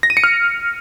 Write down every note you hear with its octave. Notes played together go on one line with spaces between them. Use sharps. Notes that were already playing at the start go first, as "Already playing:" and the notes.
A#6
D#7
C#7
F6